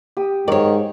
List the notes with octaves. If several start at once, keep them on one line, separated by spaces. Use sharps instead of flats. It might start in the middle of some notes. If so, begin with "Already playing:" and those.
G4 D#6
G#2 D#3 C#5 D5